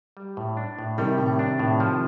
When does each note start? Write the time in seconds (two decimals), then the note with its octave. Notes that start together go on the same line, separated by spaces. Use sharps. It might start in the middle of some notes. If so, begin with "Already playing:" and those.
0.17 G3
0.37 A2
0.57 D4
0.79 A2
0.98 C3 D#3 G3
1.18 A2
1.39 D4
1.59 A2
1.80 F3